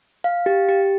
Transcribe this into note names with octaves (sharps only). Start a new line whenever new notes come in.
F5
G4
G4